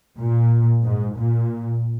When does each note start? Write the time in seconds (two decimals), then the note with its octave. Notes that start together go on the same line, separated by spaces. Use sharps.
0.19 A#2
0.84 G#2
1.17 A#2